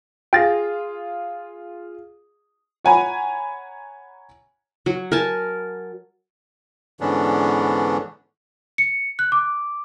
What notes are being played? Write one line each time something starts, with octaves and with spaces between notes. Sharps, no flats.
F4 G#4 G5 A6 A#6
C#5 F#5 G#5 A#5 B5
F#3
A#4 G#5 A5
G#2 D3 E3 B3 C#4 D4
C#7
F#6
D6